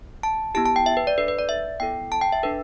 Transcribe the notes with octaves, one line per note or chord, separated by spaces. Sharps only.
A5
B3 E4 G4 A5
A5
G5
E5
B4
D5
D4 A4 B4
B4
D5
E5
B3 E4 A4 G5
A5
G5
E5
D4 A4 B4